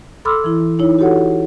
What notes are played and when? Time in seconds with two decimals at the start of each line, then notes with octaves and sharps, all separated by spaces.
0.25 A4 B5 C6 D6 E6 F6
0.44 E3 E4
0.79 D#4 E4 C#5
0.99 F#4 G4 A4 C#5 F#5